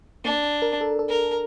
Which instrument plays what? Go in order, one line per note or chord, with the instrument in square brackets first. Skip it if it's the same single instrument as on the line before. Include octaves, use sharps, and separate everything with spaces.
[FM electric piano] A#3 [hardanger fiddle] D4
[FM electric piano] A#4
A4
A4
[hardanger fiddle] A#4